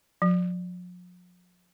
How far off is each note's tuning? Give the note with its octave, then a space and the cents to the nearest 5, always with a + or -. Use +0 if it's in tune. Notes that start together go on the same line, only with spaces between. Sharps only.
F3 +40